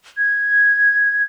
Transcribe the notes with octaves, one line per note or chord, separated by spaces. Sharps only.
G#6